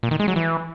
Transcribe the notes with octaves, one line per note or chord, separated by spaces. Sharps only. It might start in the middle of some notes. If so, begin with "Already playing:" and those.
A#2
D#3
G#3
F#3
E3